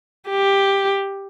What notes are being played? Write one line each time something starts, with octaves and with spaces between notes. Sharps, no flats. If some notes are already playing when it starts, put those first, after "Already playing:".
G4